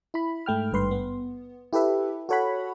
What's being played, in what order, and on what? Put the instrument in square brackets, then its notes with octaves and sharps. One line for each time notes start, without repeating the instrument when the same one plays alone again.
[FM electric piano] E4 B5
G#2 A3 G5 F6
G#1 G2 B4 C6
B3
E4 G4 A4 B4 E5
F#4 A4 C#5 F#5 B5